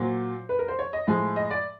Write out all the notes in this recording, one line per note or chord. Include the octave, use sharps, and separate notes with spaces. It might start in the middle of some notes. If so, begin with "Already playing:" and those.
Already playing: A#2 F#3 C5
B4
A#4
C5
C#5
D#5
A2 F3 G#3
D#5
D5